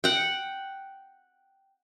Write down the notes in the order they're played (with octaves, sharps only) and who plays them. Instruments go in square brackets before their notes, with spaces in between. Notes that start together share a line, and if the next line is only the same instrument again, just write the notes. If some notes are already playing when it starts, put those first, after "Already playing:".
[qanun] F#5 G5